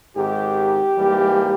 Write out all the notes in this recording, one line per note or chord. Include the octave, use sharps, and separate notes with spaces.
G#1 G#2 D#3 G4
G#2 E3 G3 A#3